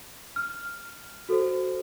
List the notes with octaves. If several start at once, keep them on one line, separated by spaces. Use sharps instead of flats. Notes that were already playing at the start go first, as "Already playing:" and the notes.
F6
F#4 A4 C5